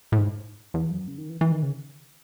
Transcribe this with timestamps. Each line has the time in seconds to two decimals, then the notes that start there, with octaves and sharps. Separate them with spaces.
0.12 A2
0.19 G#2
0.74 E2
0.91 F#2
1.08 C#3
1.18 D#3
1.30 E3
1.41 E3
1.52 D#3
1.63 C#3